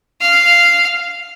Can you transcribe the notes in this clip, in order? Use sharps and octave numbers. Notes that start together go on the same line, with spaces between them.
F5